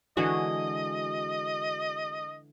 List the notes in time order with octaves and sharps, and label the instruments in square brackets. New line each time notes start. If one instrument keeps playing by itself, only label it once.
[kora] D3 E3 G#3 [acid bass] F#4 [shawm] D#5